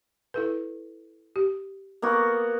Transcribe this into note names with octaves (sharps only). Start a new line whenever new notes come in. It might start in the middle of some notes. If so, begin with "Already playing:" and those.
E4 A4 B4
G4
A#3 B3 F#4